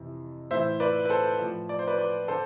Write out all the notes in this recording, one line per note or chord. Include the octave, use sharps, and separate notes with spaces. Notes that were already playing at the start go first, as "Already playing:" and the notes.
Already playing: F2 C3 E3
A2 E3 C5 E5
B4 D5
B4
A4 C5
A2 F3
D5
C5
B4 D5
B4 D5
D3 A4 C5